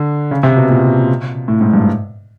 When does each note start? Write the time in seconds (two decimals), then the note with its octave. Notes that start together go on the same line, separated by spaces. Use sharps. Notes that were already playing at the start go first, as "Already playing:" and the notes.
Already playing: D3
0.31 C#3
0.43 C3
0.57 B2
0.69 A#2
1.48 A2
1.61 G#2
1.73 G2